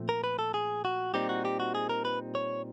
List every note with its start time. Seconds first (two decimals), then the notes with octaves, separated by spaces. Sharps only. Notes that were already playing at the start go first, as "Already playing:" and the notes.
Already playing: A#2 F3 A3 C4
0.09 A#4
0.24 B4
0.39 A4
0.54 G#4
0.85 F#4
1.14 A#2 G3 C4 D#4 G4
1.29 F#4
1.45 G4
1.60 F#4
1.75 G#4
1.89 A#4
2.05 B4
2.35 C#5